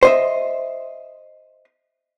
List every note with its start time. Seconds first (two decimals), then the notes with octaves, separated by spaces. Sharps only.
0.03 C5 D#5 E5